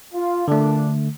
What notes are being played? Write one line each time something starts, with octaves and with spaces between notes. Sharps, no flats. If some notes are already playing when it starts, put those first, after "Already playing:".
F4
A#2 D3 A3 D4